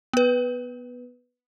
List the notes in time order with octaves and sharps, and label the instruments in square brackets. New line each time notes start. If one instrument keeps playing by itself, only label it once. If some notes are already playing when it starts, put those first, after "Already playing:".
[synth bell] B3 B4